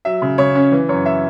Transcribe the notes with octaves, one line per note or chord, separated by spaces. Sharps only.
F#3 E5
C#3
C#3 C#5
C#4
E3
F#2 C#5
E5